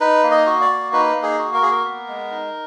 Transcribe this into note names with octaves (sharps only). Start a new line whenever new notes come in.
D#4 B4
A#3
D#5
F#4
D5
A#3
D#4 B4
A#3
G#4
F#4
A#4
A#3 G#4
A#4
B3
G#3
D#4